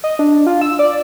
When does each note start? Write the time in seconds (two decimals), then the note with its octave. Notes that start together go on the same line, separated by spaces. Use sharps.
0.04 D#5
0.19 D4
0.46 F4
0.61 E6
0.79 D5